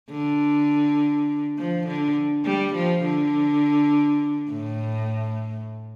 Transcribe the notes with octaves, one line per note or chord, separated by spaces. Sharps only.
D3
F3
D3
G3
F3
D3
A2